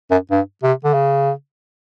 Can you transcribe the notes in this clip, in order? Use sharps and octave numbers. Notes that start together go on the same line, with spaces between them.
F#2
G2
C3
D3
C#3